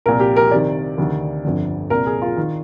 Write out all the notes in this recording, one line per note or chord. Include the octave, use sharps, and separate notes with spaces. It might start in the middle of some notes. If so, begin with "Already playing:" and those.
C2 A#2 A#4
G4
A#4
C2 C3 D#3 D5
D2 C3 D#3
G1 F2 D3
C2 A#2 A#4
G#4
F4
D#3